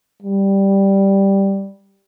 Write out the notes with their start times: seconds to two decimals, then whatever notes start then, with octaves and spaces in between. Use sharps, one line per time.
0.23 G3